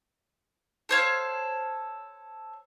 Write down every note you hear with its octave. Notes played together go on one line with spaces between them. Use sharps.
A4 C5 C#5 F5